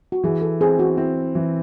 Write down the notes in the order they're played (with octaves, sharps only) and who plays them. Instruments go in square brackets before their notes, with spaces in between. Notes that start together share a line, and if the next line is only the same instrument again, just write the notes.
[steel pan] F#4
[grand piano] E3 [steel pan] G#4
[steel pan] A4
[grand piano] C4 [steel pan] G#4
[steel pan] F#4
[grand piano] C4 [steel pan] E4
[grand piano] E3